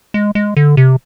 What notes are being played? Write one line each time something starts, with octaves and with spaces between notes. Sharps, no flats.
G#3
G#3
D3
C3